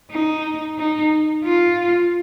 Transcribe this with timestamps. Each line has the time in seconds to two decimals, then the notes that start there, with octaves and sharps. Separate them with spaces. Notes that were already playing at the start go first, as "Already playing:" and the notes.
0.11 D#4
0.78 D#4
1.44 F4